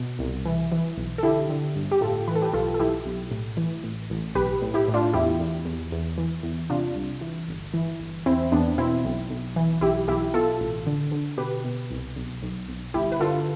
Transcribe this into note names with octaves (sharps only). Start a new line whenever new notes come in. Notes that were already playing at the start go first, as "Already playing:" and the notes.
Already playing: B2
C2
E3
E3
B1
A4
D3 E4 G4
D3
G1
G4
A2 F4 A4
E3 B4
A4
G4 B4
B1 F4 A4
A4
B1 E4 G4
B1
A2
E3
A1
A1
B1 G4 B4
A2
E4 G4
A2
D4 F4
E2 E4 G4
E2
E2
E2
E3
E2
C3 D4 F4
C2
E3
G1
E3
G1
E2 C4 E4
E2 B3 D4
B2 C4 E4
B1
B1
E3
B1 E4 G4
B1 E4 G4
B2 F4 A4
A1
D3
D3
B2 G4 B4
B2
C2
B1
B1
B1
G1 E4 G4
B4
D3 F4 A4